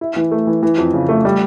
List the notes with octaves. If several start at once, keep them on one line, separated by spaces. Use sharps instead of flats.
E4
E3
A3
E3
E3
F2
C#3
A3
G3